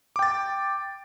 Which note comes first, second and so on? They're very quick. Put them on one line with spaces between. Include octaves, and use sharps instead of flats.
D6 G5 A6